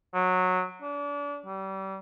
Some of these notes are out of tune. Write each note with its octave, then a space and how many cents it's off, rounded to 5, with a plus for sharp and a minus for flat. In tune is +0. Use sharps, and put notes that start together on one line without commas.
F#3 -15
D4 -35
G3 -30